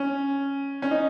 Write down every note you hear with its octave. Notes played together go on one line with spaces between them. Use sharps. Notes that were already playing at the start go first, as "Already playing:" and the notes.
Already playing: C#4
C#4
D#4